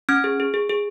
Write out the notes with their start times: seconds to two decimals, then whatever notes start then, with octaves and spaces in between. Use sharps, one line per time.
0.09 C#4 F6 G#6
0.24 G#4
0.40 G#4
0.54 G#4
0.69 G#4